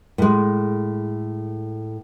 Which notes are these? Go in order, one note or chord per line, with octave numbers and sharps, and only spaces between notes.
A2 G#3